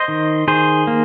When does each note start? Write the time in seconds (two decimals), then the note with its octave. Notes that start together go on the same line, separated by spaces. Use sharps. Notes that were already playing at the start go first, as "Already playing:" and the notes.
Already playing: C5 D#5
0.08 D#3
0.48 D#3 G#4 C5
0.87 A#3